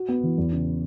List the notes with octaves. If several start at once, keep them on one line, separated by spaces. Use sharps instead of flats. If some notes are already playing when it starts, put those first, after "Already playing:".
Already playing: F#4
B3
E3
E2
C#3